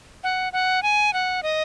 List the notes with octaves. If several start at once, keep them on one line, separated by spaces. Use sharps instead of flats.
F#5
F#5
G#5
F#5
D#5